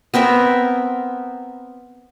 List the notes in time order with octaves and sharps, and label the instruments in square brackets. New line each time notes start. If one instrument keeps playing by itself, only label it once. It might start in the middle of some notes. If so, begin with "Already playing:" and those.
[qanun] B3 C4 A#4 E5